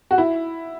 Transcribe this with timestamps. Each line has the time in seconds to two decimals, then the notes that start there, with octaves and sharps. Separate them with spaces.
0.11 F#4
0.18 E4